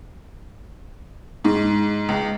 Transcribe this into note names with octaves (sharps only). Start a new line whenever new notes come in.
G#2
C#2